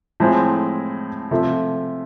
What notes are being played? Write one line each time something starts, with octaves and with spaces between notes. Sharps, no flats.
A2 F3 G#3 C4
C3 F3 A3